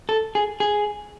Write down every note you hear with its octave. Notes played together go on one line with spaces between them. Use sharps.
A4
G#4
G#4